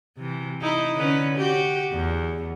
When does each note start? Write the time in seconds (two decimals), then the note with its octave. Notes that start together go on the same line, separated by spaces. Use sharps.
0.18 C3 E3
0.61 D#4 E4
0.95 D3 C#4 B4
1.36 F#4 G4
1.92 E2